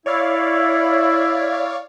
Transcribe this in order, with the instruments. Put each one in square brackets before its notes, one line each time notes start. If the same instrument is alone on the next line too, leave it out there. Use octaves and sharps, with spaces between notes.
[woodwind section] E4 [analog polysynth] C#5 D5 F5